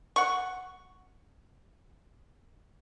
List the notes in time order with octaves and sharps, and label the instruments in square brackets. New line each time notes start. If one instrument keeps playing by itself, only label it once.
[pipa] F#5 C#6